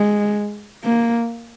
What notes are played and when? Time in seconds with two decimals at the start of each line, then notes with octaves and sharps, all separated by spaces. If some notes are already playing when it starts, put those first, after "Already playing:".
Already playing: G#3
0.84 A#3